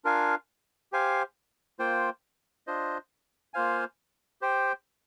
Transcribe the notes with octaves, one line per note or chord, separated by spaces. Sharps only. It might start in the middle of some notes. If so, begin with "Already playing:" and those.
D4 F4 A#4 F5 G#5
G4 C5 F5 G#5
A#3 F4 C5 G5
D4 F4 C5 D#5
A#3 F4 C5 F5 G#5
G4 C5 G5